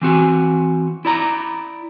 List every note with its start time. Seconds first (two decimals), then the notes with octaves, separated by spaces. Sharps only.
0.02 E3 C4 F#4 G#5
1.05 E4 D5 A#5